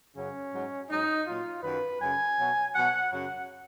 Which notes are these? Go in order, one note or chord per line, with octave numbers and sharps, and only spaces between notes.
F#2 C#3 F#3 C#4
G#2 F#3
G#2 F#3 D#4
A#2 F#3 F4
F#2 D#3 F#3 B4
F#2 C#3 F#3 G#5
B2 F#3
B2 F#3 F#5
F#2 C#3 F#3 F#5